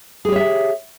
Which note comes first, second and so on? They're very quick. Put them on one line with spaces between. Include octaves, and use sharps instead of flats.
G#4 G4 C#5 E5